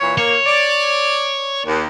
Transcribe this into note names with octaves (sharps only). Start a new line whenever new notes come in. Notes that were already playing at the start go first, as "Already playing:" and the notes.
A#2 E3 C#5
A#3 C#5
D5
D#2